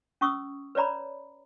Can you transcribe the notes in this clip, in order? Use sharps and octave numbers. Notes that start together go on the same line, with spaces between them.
C#4 C#6 D#6 E6
B4 C#5 D5 A#5 B5